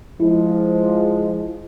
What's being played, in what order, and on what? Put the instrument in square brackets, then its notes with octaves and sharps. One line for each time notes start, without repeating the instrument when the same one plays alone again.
[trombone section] F3 G#3 [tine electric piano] E4